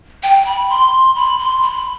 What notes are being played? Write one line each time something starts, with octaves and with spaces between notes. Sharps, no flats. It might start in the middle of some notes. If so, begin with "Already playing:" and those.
G5
B5
C6
B5
C6
B5